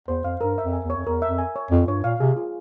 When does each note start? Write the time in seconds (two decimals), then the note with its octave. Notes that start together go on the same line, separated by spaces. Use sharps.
0.08 E2 C5
0.24 F2 F5
0.41 G2 A#4
0.58 E5
0.63 F2
0.73 G#5
0.84 E2
0.90 C#5
0.96 F2
1.06 E2 A#4
1.22 E5
1.27 F2
1.38 G#5
1.56 C#5
1.71 F2 F4
1.87 G2 C#5
2.03 A#2 F5
2.20 C3 G#4
2.37 F4